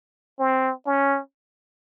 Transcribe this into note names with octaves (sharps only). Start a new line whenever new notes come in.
C4
C#4